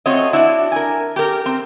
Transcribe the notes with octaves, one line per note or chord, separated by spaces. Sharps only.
A3 C4 F4 F#4 C#5 D#5
D4 E4 F#4
A#4 G#5
G4 A#4
C4